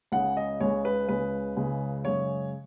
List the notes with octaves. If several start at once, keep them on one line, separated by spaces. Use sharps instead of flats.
C#2 C#3 G#3 F#5
D#5
C#2 C#3 G#3 C#5
B4
C#2 C#3 G#3 B4
C#2 C#3 G#3
F#2 C#3 G#3 C#5